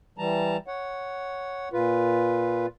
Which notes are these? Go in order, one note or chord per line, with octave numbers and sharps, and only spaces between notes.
E3 G3 A5 A#5
C#5 F#5
A#2 F4 B4